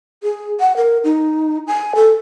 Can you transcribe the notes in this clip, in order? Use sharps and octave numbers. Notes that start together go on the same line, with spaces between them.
G#4
F#5
A#4
D#4
G#5
A4